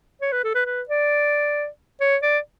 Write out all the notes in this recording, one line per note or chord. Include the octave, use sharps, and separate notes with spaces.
C#5
B4
A4
B4
B4
D5
C#5
D5